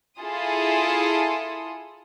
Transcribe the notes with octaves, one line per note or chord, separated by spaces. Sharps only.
E4 F4 G#4 A4 C6 D#6